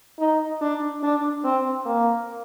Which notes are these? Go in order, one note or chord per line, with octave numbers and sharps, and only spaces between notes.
D#4
D4
D4
C4
A#3